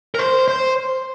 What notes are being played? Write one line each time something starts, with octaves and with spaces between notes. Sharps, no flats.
A#4
C5
C5